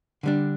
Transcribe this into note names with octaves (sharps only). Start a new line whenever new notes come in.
D3 G3 D4